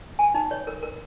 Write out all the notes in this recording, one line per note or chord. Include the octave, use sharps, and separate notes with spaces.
G#5
D#4
C#5
A#4
A#4